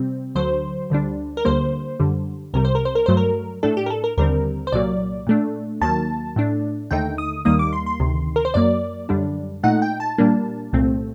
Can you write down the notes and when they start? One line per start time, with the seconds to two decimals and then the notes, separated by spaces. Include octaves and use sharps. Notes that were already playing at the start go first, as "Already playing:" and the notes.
Already playing: C3 G3 C4
0.35 D2 D3 F#3 C5
0.90 D2 D3 G3 D4
1.37 A#4
1.45 D2 D3 G3 A#3 C5
2.00 F#2 D3 G3
2.54 C2 C3 G3 A#4
2.65 C5
2.75 A#4
2.85 C5
2.95 A#4
3.06 G2 F#3 A3 C5
3.17 A#4
3.63 A2 A3 D4 A4
3.77 G4
3.86 A#4
3.90 A4
4.04 A#4
4.17 D#2 D3 G3 C4 A#4
4.67 C5
4.72 C2 A#2 F#3 A#3 D5
5.27 A#2 A3 D4
5.81 D#2 D#3 F#3 A#3 A5
6.36 A2 A3 D4
6.91 D#2 D3 A3 D#4 G5
7.18 D#6
7.45 D#2 D#3 G3 A#3 D#4 D#6
7.59 D6
7.73 C6
7.86 C6
8.00 D2 C3 D#3
8.36 A#4
8.45 C5
8.54 F#2 F#3 A#3 D5
9.09 F#2 D3 G3 D4
9.63 A#2 A3 D#4 F#5
9.82 G5
10.00 A5
10.18 A#2 G3 A#3 D4
10.73 C2 A#2 A3 C4